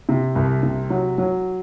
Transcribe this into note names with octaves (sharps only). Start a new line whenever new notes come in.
C3
C2
C3
F#3
F#3